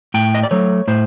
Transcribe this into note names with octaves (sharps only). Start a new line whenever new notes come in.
A2 G5
D#5
D5
F#3 A3 C#5
A2 C5